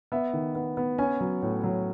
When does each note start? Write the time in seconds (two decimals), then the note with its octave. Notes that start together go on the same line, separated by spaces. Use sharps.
0.12 B3 E5
0.33 D#3
0.55 B3
0.77 B3
0.98 C#4 G#5
1.20 F#3
1.42 A2
1.64 F#3